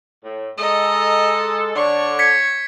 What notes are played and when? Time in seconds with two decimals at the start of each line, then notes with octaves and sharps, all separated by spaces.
0.23 A2
0.58 G#3 A4 D#5 A#5
1.76 D3 D4 C#5 C#6
2.19 G#6 B6 C#7